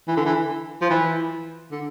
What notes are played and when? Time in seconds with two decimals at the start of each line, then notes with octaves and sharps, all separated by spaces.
0.08 E3
0.17 D3
0.26 E3
0.82 F3
0.90 E3
1.72 D3